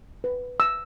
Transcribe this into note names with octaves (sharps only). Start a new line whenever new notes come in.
B4
E6